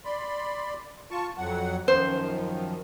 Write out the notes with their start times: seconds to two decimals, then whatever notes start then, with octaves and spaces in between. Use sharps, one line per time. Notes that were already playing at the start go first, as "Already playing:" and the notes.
0.05 D5 B5 C6
1.11 F4 A5 C#6
1.38 F2 F#3 F#5
1.88 F#2 D#3 F3 C5